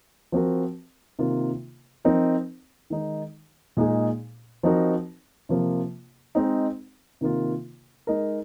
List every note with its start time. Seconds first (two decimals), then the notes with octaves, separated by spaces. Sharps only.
0.32 F3 C4 F#4 A#4
1.19 C3 D#3 A#3 F4
2.05 F3 C4 D#4 A#4
2.90 D#3 G#3 D#4
3.77 A#2 G#3 D#4 G#4
4.63 F3 C4 D#4 F#4 A#4
5.49 C3 F3 A#3 F4
6.35 G#3 C4 D#4
7.21 C3 D#3 A#3 F4
8.07 G#3 D#4 A#4